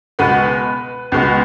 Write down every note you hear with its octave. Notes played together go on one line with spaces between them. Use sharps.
C#2 B2 G#3 B3 B4
C#2 B2 G#3 B3